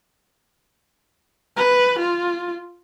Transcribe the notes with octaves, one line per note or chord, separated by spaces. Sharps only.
B4
F4